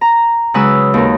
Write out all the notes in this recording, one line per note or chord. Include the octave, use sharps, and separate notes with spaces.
A#5
C#3 F#3 G#3 B4 D#6 E6
D#2 A#4